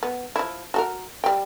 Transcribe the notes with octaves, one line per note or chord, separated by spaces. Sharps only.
B3
F3 E4
F#4 A4 A#4
G3 G5